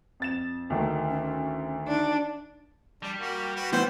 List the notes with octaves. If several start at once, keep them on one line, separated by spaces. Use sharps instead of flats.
F2 A6 E7
D2 D#3 A3
C#4
D4 D#4
G3 D4
A#3 F#4
F#4 B4
E3 B3 C5 G5